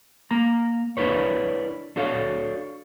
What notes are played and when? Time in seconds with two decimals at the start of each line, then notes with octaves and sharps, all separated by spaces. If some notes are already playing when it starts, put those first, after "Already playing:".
0.31 A#3 A#5
0.97 D4 E4 A#4 B4 C#5
1.96 D4 F#4 A4 C#5 F5